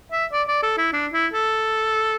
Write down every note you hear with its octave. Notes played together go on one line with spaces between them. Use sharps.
E5
D5
D5
A4
E4
D4
E4
A4